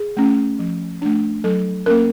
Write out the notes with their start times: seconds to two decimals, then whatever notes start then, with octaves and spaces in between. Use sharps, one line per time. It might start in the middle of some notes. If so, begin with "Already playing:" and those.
Already playing: G#4
0.17 A3 C#4
0.59 F3
1.02 A3 D4
1.44 F#3 A4
1.86 A#3 C#4 A#4